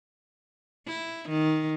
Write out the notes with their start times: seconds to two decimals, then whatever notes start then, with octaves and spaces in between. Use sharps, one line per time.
0.87 E4
1.29 D#3